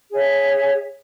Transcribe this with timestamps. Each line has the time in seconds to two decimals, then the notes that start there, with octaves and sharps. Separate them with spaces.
0.10 G#4 C#5 E5